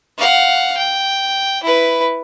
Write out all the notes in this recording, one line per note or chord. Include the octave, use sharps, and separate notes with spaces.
F5 F#5
G5
E4 B4